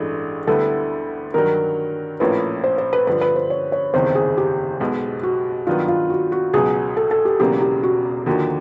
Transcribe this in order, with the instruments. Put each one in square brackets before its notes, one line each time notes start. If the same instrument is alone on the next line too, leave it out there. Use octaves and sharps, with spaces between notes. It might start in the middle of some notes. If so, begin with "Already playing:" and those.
Already playing: [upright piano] A1 G2 E3 G#3 [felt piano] A4
[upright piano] D2 D3 G3 B3 E4 [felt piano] A4
[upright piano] G2 D#3 F#3 [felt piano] A#4
[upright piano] A#1 A2 F3 A#3 C#4 [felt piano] B4
[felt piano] C5
C5
B4
[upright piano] G2 D3 F3 [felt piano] B4
[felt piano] B4
C5
C#5
C#5
[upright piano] F#1 E2 C3 D#3 [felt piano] C5
[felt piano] G#4
G4
[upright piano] B1 B2 G#3
[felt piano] F#4
[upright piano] G2 D#3 F#3 B3 [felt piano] F4
[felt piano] F4
F#4
F#4
[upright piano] C#2 B2 F#3 [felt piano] G#4
[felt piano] A4
A4
G4
[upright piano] E1 E2 C#3 F#3 A#3 [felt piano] G4
[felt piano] G4
F#4
[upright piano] D#2 D3 F3 A#3 [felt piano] F#4